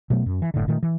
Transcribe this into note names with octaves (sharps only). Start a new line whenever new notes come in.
B2 F#3 A3 B3
F#2
E3
F#1 A2 D3
A#2 D#3 A3
E3